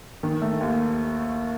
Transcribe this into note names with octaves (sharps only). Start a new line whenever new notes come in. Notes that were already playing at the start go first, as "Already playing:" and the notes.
D#3
A3
D#2